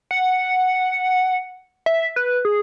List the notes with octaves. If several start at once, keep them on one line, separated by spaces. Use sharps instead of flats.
F#5
E5
B4
G#4